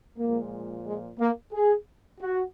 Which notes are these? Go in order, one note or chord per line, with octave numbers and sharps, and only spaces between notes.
A#2 F3 G#3 A#3
G#3
A#3
G#4
F#4